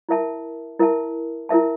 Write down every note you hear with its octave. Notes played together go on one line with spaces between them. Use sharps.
E4 A#4 E5 A5
E4 A#4 E5 A5
E4 A#4 E5 A5